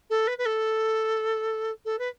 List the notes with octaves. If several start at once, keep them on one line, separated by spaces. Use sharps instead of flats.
A4
B4
B4
A4
A4
B4